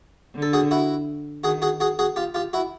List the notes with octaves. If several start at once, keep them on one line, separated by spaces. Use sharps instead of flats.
D3
A4
F#4 G#4
E4 F#4
D#3 F#4 G#4
F#4 G#4
F#4 G#4
F#4 G#4
F4 G4
F4 G4
E4 F#4